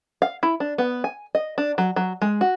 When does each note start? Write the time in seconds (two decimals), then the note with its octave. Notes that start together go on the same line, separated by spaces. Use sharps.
0.22 F5
0.43 E4
0.60 D4
0.78 B3
1.04 G#5
1.35 D#5
1.58 D4
1.78 F#3
1.96 F#3
2.22 G#3
2.41 F#4